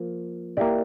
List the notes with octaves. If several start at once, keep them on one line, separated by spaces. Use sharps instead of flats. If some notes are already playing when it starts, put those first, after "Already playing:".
Already playing: F3 A#3 F4
A#3 E4 G4 D5